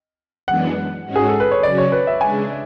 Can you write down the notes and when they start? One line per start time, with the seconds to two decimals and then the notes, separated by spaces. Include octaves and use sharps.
0.47 F#2 E3 G#3 B3 D4 F#5
1.05 G#2 G#3 C#4 F#4
1.16 G#4
1.28 A4
1.40 B4
1.51 C#5
1.63 C#3 F#3 C#4 F#4 D5
1.78 C#5
1.92 B4
2.07 E5
2.21 C#3 G#3 D4 G#5